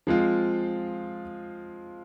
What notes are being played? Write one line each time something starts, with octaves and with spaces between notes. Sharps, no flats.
F3 G#3 C4 F4